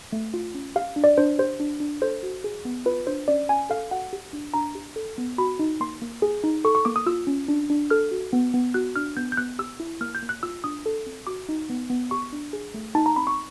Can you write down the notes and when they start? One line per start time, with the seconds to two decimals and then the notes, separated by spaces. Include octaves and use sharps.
0.12 A3
0.34 F4
0.54 C#4
0.76 G4 F5
0.96 D4
1.04 D5
1.18 D4 C5
1.39 G4 C5
1.60 D4
1.80 D4
2.02 A4 C5
2.23 F#4
2.44 G#4
2.65 B3
2.86 F4 B4
3.07 D4 C5
3.28 C#4 D5
3.49 C#4 G#5
3.70 A4 F5
3.91 F#4 F#5
4.13 G4
4.33 D4
4.54 D4 A#5
4.75 G4
4.96 A4
5.18 B3
5.38 F#4 B5
5.59 D#4
5.80 A#3 C6
6.02 A#3
6.22 G#4
6.44 D#4
6.64 A4 C#6
6.75 C#6
6.85 A#3 D6
6.96 D#6
7.06 F4 E6
7.27 C#4
7.48 D4
7.70 D4
7.90 A4 F6
8.11 F#4
8.33 B3
8.54 B3
8.74 F#4 F#6
8.96 D4 F6
9.17 B3 G6
9.32 G6
9.37 B3 F#6
9.59 G4 E6
9.80 E4
10.01 A#3 F6
10.15 G6
10.22 A#3
10.29 F#6
10.43 F4 E6
10.64 D4 D#6
10.86 A4
11.06 C4
11.27 F#4 D6
11.49 D#4
11.70 B3
11.90 B3
12.11 G4 C#6
12.33 D4
12.53 G#4
12.74 A3
12.95 D#4 A5
13.06 A#5
13.16 C4 B5
13.27 C#6